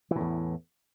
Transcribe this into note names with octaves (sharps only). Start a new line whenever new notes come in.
E2 A2 E3